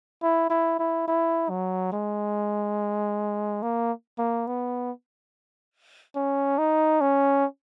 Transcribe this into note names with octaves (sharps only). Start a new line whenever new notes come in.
E4
E4
E4
E4
F#3
G#3
A#3
A#3
B3
C#4
D#4
C#4